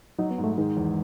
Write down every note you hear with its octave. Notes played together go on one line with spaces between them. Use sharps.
F#3 D#4
B3
G#2
A3
D#3 G#3
E2